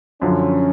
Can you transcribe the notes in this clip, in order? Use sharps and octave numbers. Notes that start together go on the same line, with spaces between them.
F#2 D3 F3 C#4